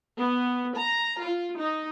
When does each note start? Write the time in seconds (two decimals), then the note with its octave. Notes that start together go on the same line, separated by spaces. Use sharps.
0.18 B3
0.77 A#5
1.22 F4
1.57 D#4